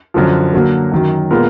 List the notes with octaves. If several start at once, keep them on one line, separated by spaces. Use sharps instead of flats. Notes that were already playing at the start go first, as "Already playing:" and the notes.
F#2 D3 F3
D3 F#3 A#3
F#2 D#3 F#3
A#2 G#3 B3 F4 A#4